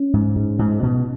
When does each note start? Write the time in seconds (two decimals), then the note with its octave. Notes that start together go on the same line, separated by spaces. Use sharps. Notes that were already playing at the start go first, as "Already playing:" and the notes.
Already playing: C#4
0.14 G#2
0.36 G#2
0.59 G#2
0.83 B2